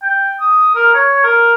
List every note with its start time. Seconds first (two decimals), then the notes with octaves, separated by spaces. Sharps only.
0.02 G5
0.41 D#6
0.75 A#4
0.94 C#5
1.24 A#4